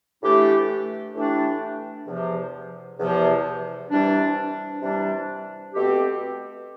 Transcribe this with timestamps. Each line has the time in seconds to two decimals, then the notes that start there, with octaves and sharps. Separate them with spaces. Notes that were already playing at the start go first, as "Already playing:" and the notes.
0.23 A2 E3 A3 D4 G4
1.15 A2 E3 A3 D4 G4
2.07 E2 C3 F3
2.99 E2 C3 F3
3.90 C3 E3 G3 D4
4.82 C3 E3 G3 D4
5.74 B2 A3 C4 G4